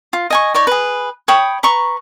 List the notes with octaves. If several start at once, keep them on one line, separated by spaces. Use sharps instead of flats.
F4
D#5 G#5 C#6
D#4 C#5 D5
G#4 B4
C#5 G5 B5 D#6
B4 A#5 C#6